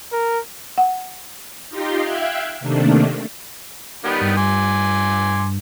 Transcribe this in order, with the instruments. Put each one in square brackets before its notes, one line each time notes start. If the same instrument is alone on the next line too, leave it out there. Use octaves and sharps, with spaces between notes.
[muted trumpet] A#4
[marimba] F#5
[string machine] D#4 F4 G4 D#5 C6
E5 F5 G5 F#6 G#6
C3 D#3 A3 A#3 D4
[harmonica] D#3 G3 B3 [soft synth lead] B5
[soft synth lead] G2
[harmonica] G#5 C6 D6